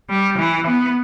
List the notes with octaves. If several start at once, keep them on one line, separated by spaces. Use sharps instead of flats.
G3
E3
B3